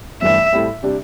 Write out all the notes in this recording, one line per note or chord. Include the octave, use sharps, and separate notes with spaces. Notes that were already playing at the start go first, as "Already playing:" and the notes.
G1 G2 E3 A3 E5
A2 G3 C4 E4 A4
C3 G3 D4 G4